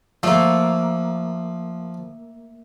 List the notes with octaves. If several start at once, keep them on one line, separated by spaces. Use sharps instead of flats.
F3 A3 A#3